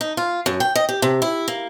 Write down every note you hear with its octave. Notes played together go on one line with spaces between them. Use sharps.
D#4
F4
F#2
G5
D#5
G4
C3
E4
A#3